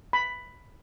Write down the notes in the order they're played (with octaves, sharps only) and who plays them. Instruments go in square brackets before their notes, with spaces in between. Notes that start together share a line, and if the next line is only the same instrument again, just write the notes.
[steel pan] B5